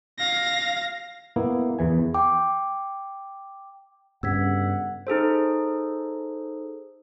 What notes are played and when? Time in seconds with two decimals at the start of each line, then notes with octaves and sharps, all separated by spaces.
0.19 F5 A#6
1.36 A#3 B3 E4
1.79 E2 E3 G#5
2.14 G5 D6
4.23 G1 G2 C#3 F#5 E6 G#6 B6
5.07 D#4 G#4 A4 C5